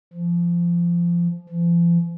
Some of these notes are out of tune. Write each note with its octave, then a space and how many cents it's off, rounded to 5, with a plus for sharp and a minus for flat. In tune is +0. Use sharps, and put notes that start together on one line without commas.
F3 -20
F3 -40